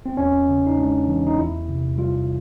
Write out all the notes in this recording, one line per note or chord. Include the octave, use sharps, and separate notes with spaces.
C4
E2 C#4
C#3
D#4
G#3 D4
E3
D#4
E2 E4
C3
G3 F4